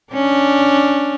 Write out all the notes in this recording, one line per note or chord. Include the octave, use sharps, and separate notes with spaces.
C#4 D4